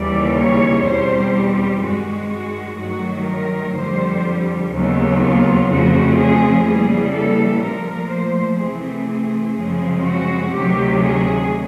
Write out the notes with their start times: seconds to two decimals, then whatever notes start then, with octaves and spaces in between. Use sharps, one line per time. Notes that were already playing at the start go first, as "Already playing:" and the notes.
Already playing: D#2 C#3 E3 G3 D5
0.37 C#5
0.86 E2 B2 G3 C4 C5
1.34 G4
1.82 G2 D#3 G#3 F#4
2.30 F#4
2.79 G2 D#3 F#3 A3 F#4
3.27 A#4
3.75 F2 D3 G3 C5
4.72 D#2 C#3 F#3 B3
5.21 F4
5.69 F2 C#3 F3 A3 C4 F#4
6.18 G#4
6.66 C#3 E3 G3 A#3 G#4
7.14 A4
7.63 A#2 F3 A3 A#4
8.11 C5
8.60 C3 E3 A3 C4 G#4
9.56 F#2 C#3 F3 G#3 C4 G#4
10.05 F#4
10.54 D2 C3 D#3 F#3 G4
11.01 G#4